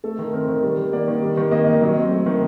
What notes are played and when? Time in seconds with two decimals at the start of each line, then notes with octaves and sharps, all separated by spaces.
0.04 A3 A4
0.19 D#3
0.33 C4 A#4
0.48 D#3
0.63 G3
0.78 D#3
0.93 A#3 D5
1.07 D#3
1.22 G3
1.37 D#3
1.51 A#3 D#5
1.67 D#3
1.81 F#3 D#5
1.96 C4
2.11 A3
2.26 D#3